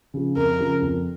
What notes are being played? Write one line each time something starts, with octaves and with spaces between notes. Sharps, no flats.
C#3 F3
F2 A#4
C#3 F3
F2